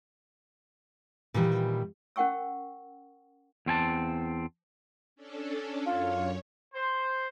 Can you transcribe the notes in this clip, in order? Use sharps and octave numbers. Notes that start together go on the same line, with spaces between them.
A#2 D#3 E3 G3
C#4 A#4 F#5 G5 C#6 E6
E2 C4 G#5 A5
C#4 D4 A4
F#2 F4 C#5
C5